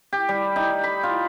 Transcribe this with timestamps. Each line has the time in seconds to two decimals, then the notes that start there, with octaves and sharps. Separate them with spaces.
0.13 G4
0.29 G3
0.56 D#4
0.83 B5
1.03 F4